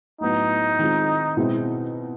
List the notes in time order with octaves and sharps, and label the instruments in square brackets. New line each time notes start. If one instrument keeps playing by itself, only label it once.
[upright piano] A2 F#3 B3 [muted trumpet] D#4
[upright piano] D#3 G#3 C4 F4
B2 G#3 C4 E4